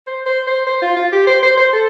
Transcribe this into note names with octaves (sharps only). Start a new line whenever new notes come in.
C5
C5
C5
C5
F4
F4
G4
C5
C5
C5
A4